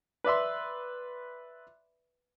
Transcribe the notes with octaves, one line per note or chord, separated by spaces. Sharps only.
B4 D5 E5 C6